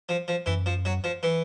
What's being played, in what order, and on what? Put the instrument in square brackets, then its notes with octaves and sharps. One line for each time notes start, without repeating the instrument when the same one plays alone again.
[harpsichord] F3
F3
[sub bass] F#2 [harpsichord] E3
[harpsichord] F3
F#3
F3
E3